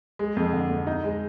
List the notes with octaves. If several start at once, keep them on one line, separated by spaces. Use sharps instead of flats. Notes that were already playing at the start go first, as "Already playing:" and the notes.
G#3
F2
D3
F2
D#4
G#3